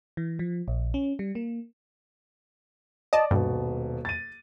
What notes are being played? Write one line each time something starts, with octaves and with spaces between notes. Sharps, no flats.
E3
F3
A#1
C#4
G3
A#3
D5 D#5 A5
D#1 G2 B2
A6 D#7